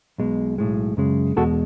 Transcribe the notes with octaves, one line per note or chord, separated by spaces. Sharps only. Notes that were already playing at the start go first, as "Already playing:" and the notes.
B1 B2 G#3
B1 A2 G#3
F#2 C#3 G#3
E2 B2 G#3 F#4 A4